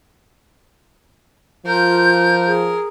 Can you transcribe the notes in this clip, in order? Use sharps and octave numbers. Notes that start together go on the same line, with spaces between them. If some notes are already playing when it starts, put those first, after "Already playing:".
F3 F4 A#4 G6
G#4